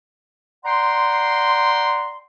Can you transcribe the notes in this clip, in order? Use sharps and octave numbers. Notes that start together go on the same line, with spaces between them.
D5 F#5 G5 A#5 C6